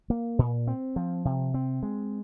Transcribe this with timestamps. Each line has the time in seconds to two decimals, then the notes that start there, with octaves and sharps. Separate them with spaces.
0.10 A#3
0.39 A#2
0.68 C4
0.96 F3
1.25 C3
1.54 C4
1.83 G#3